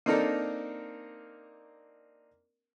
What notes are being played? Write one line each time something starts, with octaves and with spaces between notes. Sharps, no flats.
A#3 C4 D4 D#4 A4 A#4